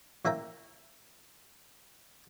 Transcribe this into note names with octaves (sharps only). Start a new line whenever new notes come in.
A1 A#3 E5 G5 A#5